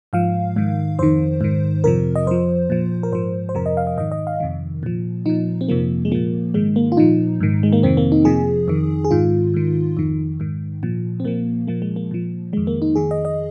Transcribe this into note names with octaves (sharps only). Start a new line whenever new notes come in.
G#2 F3 F5
G#2 D#3
F2 D#3 C5
G#2 D#3
F2 C3 F3 A#4
D#5
F2 F3 C5
A#2 F3
A#4
G#2 F3 C5
C5
F2 C3 F3 A#4
D#5
F5
D#5
G#2 D#3 D#5
D#5
F5
F2 C3 D#3
A#2 F3
A#2 F3 D#4
C4
F2 C3 F3 A#3
G#3
A#2 F3 A#3
G#2 D#3 G#3
A#3
F4
A#2 F3 D#4
G#2 D#3
G#3
A#3
F2 C3 D#3 C4
A#3
D#4
F2 C3 F3 G#4
F2 D#3
G#4
G#2 D#3 F4
G#2 D#3
F2 D#3
G#2 D#3
A#2 F3
C4
A#2 F3 A#3
A#2 F3 A#3
G#3
A#3
A#2 F3
F2 D#3 G#3
A#3
D#4
F2 D#3 G#4
D#5
D#5